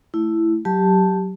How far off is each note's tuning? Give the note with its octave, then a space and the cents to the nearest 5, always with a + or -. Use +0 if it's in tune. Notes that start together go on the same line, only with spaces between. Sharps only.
A3 +0 E4 +5
F#3 +15 G4 +0 A5 +0